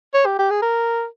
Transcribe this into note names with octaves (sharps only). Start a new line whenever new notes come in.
C#5
G4
G4
G#4
A#4